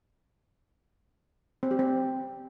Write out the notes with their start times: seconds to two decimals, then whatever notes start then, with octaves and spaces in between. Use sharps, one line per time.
1.63 C4
1.71 G4
1.79 C4